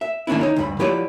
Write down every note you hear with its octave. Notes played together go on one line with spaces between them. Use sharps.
E5
D#3 A#3 C#4 D4 E4
D#4 C#5
D2 G2 B5
F3 E4 G4 B4 C#5 D5